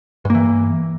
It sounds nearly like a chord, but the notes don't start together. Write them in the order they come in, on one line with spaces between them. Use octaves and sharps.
G2 A#3 E3